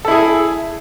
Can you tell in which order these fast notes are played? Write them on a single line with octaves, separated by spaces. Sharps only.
A4 E4 G#4